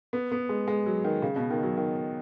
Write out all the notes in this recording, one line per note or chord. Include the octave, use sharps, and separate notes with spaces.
B3
B3
G#3
G#3
F#3
D#3
C#3
B2
D#3
F#3
D#3